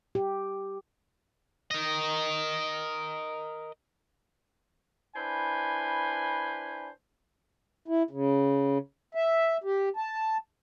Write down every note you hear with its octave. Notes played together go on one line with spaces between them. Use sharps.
G4
A#4 D#5
D4 E4 B4 C5 G#5 B5
E4
C#3
E5
G4
A5